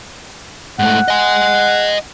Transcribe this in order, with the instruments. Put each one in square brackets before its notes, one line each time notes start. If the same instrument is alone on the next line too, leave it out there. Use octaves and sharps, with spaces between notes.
[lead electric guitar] G#2 A3 [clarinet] F#5
[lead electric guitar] D#5 G#5